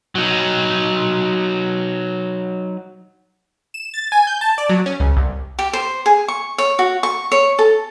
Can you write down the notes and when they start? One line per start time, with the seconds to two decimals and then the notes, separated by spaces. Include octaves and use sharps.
0.15 F#3 D#4
3.74 E7
3.94 A6
4.12 G#5
4.27 G6
4.41 A5
4.58 D5
4.69 F#3
4.86 C#4
5.00 C#2
5.17 C2
5.59 G4
5.73 C5
6.06 G#4
6.28 C#6
6.58 C#5
6.79 F#4
7.03 C#6
7.32 C#5
7.59 A4